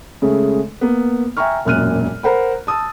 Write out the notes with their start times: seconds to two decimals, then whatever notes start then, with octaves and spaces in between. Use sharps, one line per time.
0.22 C#3 G#3 A3
0.81 A#3 B3
1.37 E5 G5 G#5 A#5 C#6 F6
1.65 E1 F#2 A#2 F6 F#6 D#7
2.23 A#4 C5 F#5 B5
2.67 A5 D#6 E6 A6